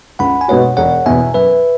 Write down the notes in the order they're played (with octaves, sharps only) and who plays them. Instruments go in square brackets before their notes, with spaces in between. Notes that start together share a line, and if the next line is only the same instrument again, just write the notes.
[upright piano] C#2 [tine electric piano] F#5 B5
[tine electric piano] G#5
[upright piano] B2 G#3 B3 F#4 [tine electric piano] C#5 F#5
[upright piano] E1 [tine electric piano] C#5 F#5
[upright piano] E2 B2 [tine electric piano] E5 G#5
[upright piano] F#2 [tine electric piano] B4 E5